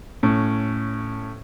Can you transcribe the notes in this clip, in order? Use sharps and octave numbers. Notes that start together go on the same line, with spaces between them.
A2 C#4